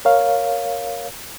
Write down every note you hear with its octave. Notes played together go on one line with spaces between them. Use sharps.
A#4 C#5 F5